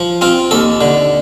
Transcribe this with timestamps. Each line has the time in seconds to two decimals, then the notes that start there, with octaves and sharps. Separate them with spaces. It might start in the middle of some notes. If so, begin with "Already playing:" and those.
Already playing: F3
0.21 C4 F4
0.51 D#2 A4
0.81 D3